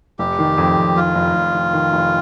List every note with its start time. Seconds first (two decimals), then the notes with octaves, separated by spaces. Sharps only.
0.19 F1 G4
0.39 D#3
0.58 F2
0.77 F2
0.96 F1 F4
1.15 F1
1.34 F1
1.54 F1
1.73 D#3
1.93 F1